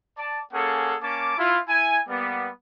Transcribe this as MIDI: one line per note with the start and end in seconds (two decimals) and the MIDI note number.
0.18 0.40 74
0.18 0.40 81
0.53 0.95 58
0.53 0.95 61
0.53 0.95 68
0.53 0.95 69
0.53 0.95 78
1.02 1.35 58
1.02 1.35 61
1.02 1.35 81
1.02 1.35 86
1.37 1.58 64
1.37 1.58 65
1.68 1.99 64
1.68 1.99 80
2.08 2.49 55
2.08 2.49 58
2.08 2.49 59